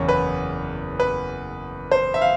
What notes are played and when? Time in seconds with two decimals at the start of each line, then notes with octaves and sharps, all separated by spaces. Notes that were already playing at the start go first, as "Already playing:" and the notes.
Already playing: F#1 E2 C#5
0.09 B4
1.00 B4
1.92 C5
2.14 E5
2.21 F5